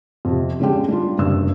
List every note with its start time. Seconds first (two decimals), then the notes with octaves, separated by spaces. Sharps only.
0.25 F2 C3
0.60 D3 G#3 C#4 D4 G4
0.88 G3 D4 F4
1.18 F#1 G2 C3 E6